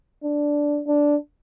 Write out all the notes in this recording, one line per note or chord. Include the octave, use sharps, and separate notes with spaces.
D4
D4